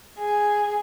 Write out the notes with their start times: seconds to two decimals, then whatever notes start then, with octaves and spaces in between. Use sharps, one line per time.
0.19 G#4